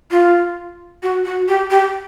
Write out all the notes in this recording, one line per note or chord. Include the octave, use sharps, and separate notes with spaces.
F4
F#4
F#4
G4
G4